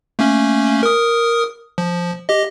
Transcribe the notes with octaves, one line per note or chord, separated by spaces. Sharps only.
A3 A#3 C#4
A#4 D#6
F3
G4 D#5